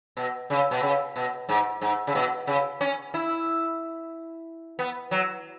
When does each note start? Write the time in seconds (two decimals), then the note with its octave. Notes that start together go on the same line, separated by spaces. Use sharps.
0.17 B2
0.50 C#3
0.71 B2
0.83 C#3
1.16 B2
1.49 G#2
1.81 G#2
2.07 C#3
2.15 B2
2.47 C#3
2.81 C#4
3.14 E4
4.79 B3
5.11 F#3